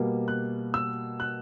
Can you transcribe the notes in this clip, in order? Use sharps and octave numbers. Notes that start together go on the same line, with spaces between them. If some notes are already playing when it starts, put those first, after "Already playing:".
Already playing: B2 G3 A#3
F#6
E6
F#6